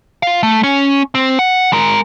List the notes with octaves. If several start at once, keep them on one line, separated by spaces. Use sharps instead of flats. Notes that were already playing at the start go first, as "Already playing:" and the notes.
F4 F5
A3
C#4
C4
F#5
G#3 A#4